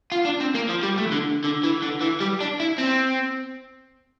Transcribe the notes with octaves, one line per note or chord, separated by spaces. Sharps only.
F4
D4
C4
A#3
F3
G3
A3
E3
D3
D3
E3
D3
E3
G3
D4
E4
C4